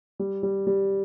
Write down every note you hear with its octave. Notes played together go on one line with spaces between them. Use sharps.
G3
G3
G3